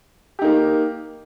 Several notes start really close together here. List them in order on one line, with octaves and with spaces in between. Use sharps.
G4 D#4 A#3